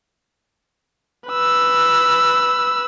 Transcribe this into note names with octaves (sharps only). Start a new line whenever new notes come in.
B4 E6